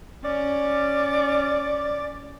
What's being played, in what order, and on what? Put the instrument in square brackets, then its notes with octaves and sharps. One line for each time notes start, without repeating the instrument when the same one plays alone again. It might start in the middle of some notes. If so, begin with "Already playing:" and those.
[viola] C#4 [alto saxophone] D5